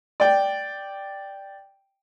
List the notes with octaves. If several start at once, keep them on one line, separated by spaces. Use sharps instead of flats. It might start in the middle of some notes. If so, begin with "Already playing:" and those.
D5 G5